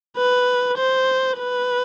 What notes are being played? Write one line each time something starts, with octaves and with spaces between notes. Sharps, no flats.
B4
C5
B4